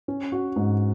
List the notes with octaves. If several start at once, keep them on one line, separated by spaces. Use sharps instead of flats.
C#4
F#4
G#2